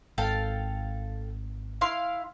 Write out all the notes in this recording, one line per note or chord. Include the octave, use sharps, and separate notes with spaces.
G#1 A4 F5 G5
E4 F5 C6